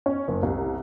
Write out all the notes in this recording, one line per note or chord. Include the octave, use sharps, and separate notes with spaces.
C#4
F#1
C2